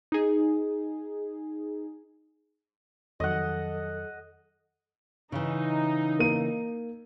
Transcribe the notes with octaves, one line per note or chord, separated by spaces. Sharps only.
D#4 G#4
F2 D#3 F#3 A4 D#5 F#5
C#3 E3 D#4
A#3 D#7